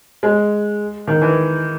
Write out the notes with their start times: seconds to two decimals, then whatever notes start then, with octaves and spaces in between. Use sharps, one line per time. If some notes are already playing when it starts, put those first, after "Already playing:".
0.23 G#3
1.08 D#3
1.22 E3